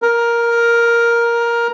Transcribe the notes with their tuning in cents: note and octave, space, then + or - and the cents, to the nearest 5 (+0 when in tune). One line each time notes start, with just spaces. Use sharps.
A#4 +10